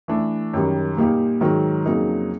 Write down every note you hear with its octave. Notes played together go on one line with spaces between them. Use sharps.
E3 A3 D4
F#2 D#3 G3
A#2 G3 A#3 D#4 G4
G#2 D#3 F#3
F2 C#3 F#3 A#3 D#4